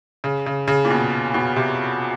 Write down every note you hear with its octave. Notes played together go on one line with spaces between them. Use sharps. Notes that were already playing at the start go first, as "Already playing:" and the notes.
C#3
C#3
C#3
A#2
B2
B2
C3